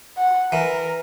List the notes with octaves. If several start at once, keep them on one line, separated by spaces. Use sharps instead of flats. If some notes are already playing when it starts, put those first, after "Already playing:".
F#5
E3 A#4